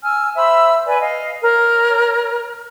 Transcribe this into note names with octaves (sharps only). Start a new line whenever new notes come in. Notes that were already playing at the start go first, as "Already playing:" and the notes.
G#5 E6 F6
C5 E5 B5 E6
B4 D5 G#5
D#5 F5
A#4 C#5